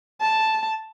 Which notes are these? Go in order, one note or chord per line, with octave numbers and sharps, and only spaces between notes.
A5